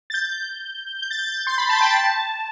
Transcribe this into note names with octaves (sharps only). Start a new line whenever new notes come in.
A6
G6
G6
A6
G6
C6
B5
A5
G5
A5